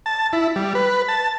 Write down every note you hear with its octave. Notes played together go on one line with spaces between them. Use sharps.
A5
E4
G3
B4
A5